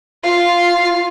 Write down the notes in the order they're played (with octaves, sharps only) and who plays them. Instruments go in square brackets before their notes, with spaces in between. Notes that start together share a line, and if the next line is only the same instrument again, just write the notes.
[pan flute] F4 [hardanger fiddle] F5